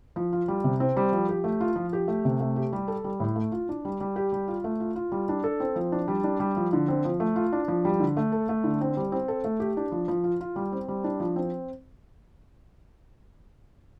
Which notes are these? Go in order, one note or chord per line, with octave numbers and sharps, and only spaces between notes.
F3
F4
G3
C3
C4
G3
F3
G4
A3
F4
F3
G4
A3
C3
A3
G4
G3
A4
G3
A2
A3
F4
D4
G3
G3
G4
G3
F4
A3
F4
F4
G3
D4
A4
C4
F3
D4
G3
D4
G3
F3
D3
C4
F3
A3
F4
D4
F3
G3
D3
A3
A4
A3
D3
C4
G3
C4
A4
A3
G4
D4
F3
F3
F4
F4
G3
C4
G3
D4
F3
C4